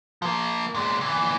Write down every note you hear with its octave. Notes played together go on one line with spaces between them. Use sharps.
F3 A#3
A#2 G#3
A#2 E3